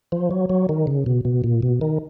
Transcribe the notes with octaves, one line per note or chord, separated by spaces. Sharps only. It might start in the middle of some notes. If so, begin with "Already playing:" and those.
F3
F#3
F#3
D#3
C#3
B2
B2
A#2
B2
D#3